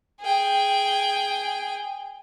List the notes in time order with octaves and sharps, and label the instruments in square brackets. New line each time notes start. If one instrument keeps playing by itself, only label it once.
[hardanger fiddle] G#4 G5